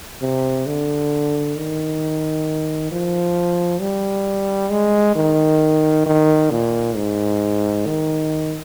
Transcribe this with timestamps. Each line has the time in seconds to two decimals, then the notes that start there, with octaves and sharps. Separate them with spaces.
0.22 C3
0.67 D3
1.56 D#3
2.92 F3
3.81 G3
4.71 G#3
5.16 D#3
6.06 D#3
6.51 A#2
6.96 G#2
7.86 D#3